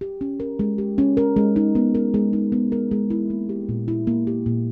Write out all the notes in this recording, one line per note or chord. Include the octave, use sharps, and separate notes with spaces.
G4
C#4
A#4
G#3
G4
C#4
A#4
G#3
D#4
B3
A#4
G#3
D#4
B3
A#4
G#3
E4
A#3
G4
A#2
E4
A#3
G4
A#2